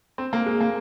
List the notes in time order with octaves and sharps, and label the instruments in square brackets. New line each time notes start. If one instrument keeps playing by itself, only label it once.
[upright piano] C4
A#3
G#3
A#3